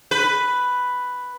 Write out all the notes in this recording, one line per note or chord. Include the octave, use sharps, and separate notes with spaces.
B4